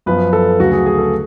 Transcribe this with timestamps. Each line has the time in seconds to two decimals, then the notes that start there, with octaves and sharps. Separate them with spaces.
0.06 F#2 F3 B3 B4
0.33 A4
0.59 D2 C#3 F#3 A3 F#4
0.72 G#4
0.86 G#4
0.98 A4